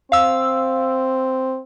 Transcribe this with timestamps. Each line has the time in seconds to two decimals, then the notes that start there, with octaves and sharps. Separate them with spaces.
0.12 C4 F5 E6